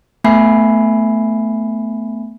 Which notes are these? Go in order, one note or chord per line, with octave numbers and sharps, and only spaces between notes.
A3 B3 E5 G#5 B5 C7